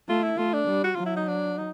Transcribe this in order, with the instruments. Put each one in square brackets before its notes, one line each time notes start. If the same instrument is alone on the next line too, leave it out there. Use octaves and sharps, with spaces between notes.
[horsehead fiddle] A3 [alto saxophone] F4
[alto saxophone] E4
[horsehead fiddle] A3 [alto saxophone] F4
[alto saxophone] D4
[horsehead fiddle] G3
[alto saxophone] F#4
[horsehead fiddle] F#3 [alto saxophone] F4
[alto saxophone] E4
D#4
D4
D#4